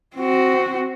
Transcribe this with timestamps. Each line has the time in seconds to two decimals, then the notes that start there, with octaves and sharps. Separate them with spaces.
0.16 C4 F#4